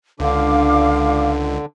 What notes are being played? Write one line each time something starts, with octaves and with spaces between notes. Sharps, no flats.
C#2 D3 D4 F5 D6